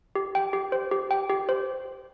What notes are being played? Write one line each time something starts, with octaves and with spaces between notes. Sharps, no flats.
G4
G5
G4
C5
G4
G5
G4
C5